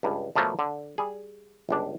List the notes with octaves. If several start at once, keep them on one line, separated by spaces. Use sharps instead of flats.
C#2 G2
B2 F3 F#3 A3 A#3
D3
G3 G#4
G1 C#2 D4